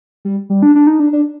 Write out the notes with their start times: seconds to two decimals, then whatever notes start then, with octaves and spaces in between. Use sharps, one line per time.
0.25 G3
0.50 G3
0.63 D4
0.75 D4
0.87 D#4
1.00 D4
1.13 D4